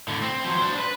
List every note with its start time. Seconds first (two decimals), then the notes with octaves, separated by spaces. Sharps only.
0.08 A2 D3
0.22 C4
0.44 F3 F#3
0.57 D4 C5
0.79 B4